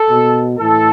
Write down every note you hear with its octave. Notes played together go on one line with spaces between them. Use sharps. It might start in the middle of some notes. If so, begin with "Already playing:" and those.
Already playing: A4
B2
A2 E3 A4